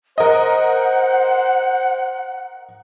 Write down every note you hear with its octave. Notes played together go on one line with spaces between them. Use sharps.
A#4 C5 D#5 F#5